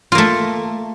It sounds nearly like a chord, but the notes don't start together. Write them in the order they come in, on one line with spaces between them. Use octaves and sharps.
F4 A#3 A3